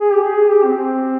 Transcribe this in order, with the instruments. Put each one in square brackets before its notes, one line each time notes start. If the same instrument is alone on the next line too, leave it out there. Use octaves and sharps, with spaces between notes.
[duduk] G#4
G4
G#4
G4
C4